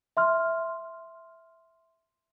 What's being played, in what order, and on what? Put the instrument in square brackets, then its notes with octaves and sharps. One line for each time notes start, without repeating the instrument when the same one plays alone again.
[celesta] E5 C6 F6